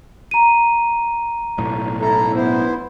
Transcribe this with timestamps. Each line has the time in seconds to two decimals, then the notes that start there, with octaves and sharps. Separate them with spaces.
0.31 A#5 D#7
1.58 B1 A2
2.01 E4 A4 A#5
2.35 B3 E4 C5